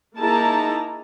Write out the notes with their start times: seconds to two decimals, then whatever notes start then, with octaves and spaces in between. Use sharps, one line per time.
0.18 A#3 D#4 E4 G#4 A5 A#5